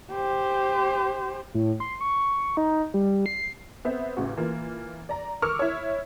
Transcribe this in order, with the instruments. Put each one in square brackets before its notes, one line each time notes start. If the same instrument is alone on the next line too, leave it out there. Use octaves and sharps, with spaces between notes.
[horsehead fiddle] G4 C5
[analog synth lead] A2
C6
C#6
D#4
G3
C7
[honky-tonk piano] B3 C4 C5 E5
A1 C#3 F#4
E3 A#3 F4
D5 A#5
A#4 C#6 D6 E6 F6
E4 C#5